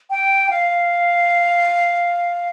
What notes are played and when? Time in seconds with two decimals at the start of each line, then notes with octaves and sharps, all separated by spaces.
0.10 G5
0.50 F5